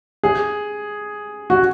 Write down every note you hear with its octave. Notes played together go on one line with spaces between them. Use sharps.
G#4
F#4